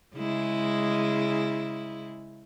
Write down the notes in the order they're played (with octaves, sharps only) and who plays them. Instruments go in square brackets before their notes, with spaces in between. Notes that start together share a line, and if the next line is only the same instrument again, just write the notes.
[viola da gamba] C#3 G#3 E4